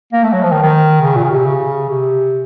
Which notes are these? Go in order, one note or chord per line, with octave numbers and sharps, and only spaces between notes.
A#3
A3
F#3
F3
D#3
D#3
C#3
A#2
C#3
C3
C#3
C3